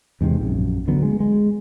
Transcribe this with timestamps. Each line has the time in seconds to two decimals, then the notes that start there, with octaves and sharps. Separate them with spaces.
0.21 E2 G#2 C3
0.40 A#1 F#2
0.87 D2 D3 F#3 B3
1.02 G#3
1.20 G#3